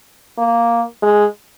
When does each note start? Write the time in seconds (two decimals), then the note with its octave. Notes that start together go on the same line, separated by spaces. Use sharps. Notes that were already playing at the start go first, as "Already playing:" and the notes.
0.38 A#3
1.02 G#3